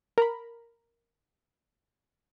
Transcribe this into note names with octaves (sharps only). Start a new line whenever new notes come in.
A#4 A#5 B5